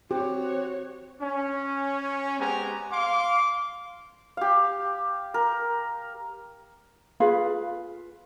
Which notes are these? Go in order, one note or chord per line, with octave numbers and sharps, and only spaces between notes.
C4 F#4 G4 C#5
C#4
G#3 B3 C4 G4 G#5 A#5
F5 C6 D6
G4 F5
A#4
F4 G#4 B4 F5